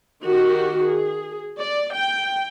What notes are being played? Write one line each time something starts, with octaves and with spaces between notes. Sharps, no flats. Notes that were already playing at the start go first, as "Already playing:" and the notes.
D#3 F#4 G4
G#4
D5
G5